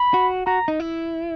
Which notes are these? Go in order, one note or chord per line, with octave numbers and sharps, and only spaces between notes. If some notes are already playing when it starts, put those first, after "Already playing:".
Already playing: B5
F#4
F#4 A#5
D#4
E4